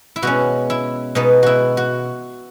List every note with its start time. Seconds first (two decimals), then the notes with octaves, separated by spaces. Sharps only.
0.16 E4
0.22 B2 G#3 C#4 F#4
0.70 E4
1.15 B2 G#3 B3 D#4
1.43 E4 F#4
1.77 F#4